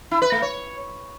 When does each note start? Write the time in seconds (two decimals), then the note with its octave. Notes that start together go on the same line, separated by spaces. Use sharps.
0.11 E4
0.22 B4
0.32 A3
0.42 C#5